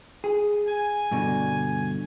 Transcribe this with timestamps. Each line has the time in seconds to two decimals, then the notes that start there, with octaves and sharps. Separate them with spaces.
0.24 G#4
0.66 G#5
1.11 G2 B2 D3